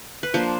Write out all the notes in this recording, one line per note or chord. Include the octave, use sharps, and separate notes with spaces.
B4
F3 A#3 D4 C5